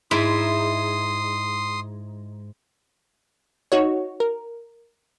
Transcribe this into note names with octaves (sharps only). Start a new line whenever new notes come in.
G#2 E4 C6 D#6
D#4 F#4 C#5
A#4